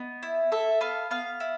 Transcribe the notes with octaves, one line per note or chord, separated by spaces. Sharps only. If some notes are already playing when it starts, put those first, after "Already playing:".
Already playing: B3 D#5
E4
A4 E5
B3 F5
B3 F5
E4